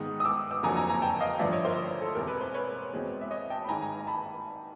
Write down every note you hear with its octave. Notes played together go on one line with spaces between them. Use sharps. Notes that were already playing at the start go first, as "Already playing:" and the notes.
Already playing: G#2 D#3 G#3 B3 D#6
D#6
D6 E6
D6 E6
F#1 F2 D3 F#3 A#3 G#5 A#5
G#5 A#5
G#5 A#5
G5 A5
D#5 F5
A1 G2 D3 F3 D5 E5
C#5 D#5
A#4 C5
A4
E1 E2 C3 A#4
B4
C5
B4 C#5
E2 B2 G#3 C4
E5
C#5 D#5
G5 A5
B5
A1 G#2 D#3 G#3 G#5 A#5
G#5 A#5
A5 B5